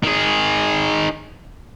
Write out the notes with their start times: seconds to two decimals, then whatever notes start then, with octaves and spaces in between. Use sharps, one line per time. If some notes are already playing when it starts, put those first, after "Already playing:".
0.03 D#3 G#4